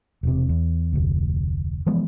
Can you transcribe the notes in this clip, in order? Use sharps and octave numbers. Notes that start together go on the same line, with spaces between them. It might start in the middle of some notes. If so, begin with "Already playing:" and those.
E1 C3
E2
F1 D2
E3 F3 G#3 B3